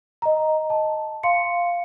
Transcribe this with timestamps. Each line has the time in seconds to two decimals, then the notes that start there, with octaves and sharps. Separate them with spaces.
0.22 D#5 A#5
0.70 A5
1.23 F5 C6 C#7